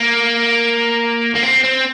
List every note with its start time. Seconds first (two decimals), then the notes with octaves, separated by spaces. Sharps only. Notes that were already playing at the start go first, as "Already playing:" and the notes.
Already playing: A#3
1.35 A#3
1.43 C4
1.64 C4